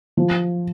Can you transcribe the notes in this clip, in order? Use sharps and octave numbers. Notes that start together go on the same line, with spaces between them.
F3